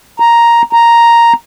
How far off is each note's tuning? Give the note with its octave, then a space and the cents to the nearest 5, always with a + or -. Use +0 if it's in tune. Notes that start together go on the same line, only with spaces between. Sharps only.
A#5 +5
A#5 +0